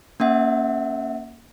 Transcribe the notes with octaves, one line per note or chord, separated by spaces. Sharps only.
A#3 C#4 E5 F#5